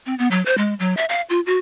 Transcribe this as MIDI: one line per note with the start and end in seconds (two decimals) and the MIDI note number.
0.06 0.15 60
0.19 0.28 59
0.31 0.44 54
0.46 0.57 72
0.58 0.74 56
0.79 0.96 54
0.97 1.05 76
1.09 1.22 77
1.30 1.40 65
1.46 1.58 66